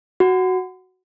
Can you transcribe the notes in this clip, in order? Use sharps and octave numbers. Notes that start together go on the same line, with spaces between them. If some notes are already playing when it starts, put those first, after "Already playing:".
F#4